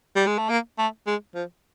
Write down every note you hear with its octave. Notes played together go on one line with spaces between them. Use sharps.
G3
G#3
A3
A#3
A3
G#3
F3